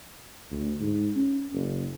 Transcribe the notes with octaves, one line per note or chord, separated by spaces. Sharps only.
D2
G#2
C#4
F#1